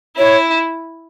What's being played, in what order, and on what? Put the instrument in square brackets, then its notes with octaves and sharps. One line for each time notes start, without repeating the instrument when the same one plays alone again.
[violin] E4 [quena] C#5